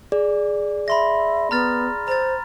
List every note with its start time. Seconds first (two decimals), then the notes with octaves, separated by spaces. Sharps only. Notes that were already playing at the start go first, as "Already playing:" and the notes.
0.12 G#4 D5
0.88 E5 B5 C6 A#6
1.51 B3 A#5 F6 A6
2.08 C5 A#5 A6